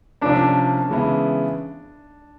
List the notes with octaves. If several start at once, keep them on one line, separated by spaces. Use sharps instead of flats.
C3 F3 A#3 C#4 D4
C#3 E3 G#3 B3 E4